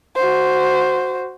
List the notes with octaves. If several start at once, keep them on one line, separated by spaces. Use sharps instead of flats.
F#4 C5